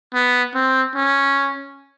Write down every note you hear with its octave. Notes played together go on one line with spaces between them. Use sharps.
B3
C4
C#4